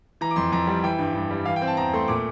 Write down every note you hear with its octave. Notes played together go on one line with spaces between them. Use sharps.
E3 A#5
D6
F2 C6
F2 A#5
G3
E3 G5
G2
G2
G3
E3 F5
G5
C4
A5
E2 A#5
A3 C6
A#2 D6